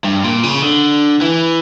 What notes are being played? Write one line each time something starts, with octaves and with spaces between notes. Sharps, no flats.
G2
A#2
C#3
D3
E3